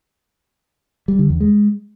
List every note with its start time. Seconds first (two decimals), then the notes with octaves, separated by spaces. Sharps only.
1.08 G3
1.19 D3
1.30 E2
1.40 G#3